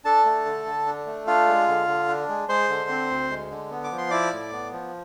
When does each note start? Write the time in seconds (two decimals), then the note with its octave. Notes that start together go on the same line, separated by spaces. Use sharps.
0.05 D4 A4 A5
0.25 A3
0.45 D3
0.66 D3
0.87 D4
1.06 A3
1.27 D4 F4 F5
1.48 G#3
1.68 D3
1.87 D3
2.08 D4
2.29 G#3
2.49 G#3 C5 C6
2.69 D3
2.89 C4
3.10 D2
3.31 G#3
3.50 D3
3.71 B3
3.84 D6
3.92 F3
3.98 C6
4.10 E4 D5 D6
4.32 A2
4.52 B3
4.72 F3